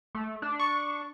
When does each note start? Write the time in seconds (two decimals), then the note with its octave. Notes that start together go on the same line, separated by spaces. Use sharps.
0.15 A3
0.42 D4
0.60 C#6